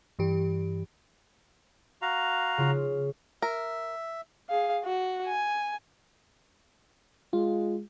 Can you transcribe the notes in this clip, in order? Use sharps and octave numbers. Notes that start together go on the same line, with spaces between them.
G2 E3 G4
F#4 F5 A#5
C#3 F4
A#4 E5
G#4 F5
F#4
G#5
G#3 F4